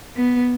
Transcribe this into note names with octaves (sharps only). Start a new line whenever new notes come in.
B3